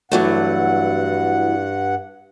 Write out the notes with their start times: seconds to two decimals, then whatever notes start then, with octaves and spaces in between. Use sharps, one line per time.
0.12 G2 E3 F#3 A3 F#5